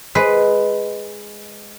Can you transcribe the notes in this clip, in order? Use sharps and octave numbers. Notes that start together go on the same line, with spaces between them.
G#3 B4